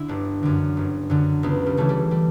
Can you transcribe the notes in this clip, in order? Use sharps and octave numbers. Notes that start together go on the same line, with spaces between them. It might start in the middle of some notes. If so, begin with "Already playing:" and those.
Already playing: D3 E4
G1 D4
F#2 D3
G1
F#2 D3
C#2 B3
G3
C#3 E3 A3
G3
G3